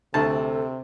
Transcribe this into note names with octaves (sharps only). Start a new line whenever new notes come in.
D2 C3 A4 A5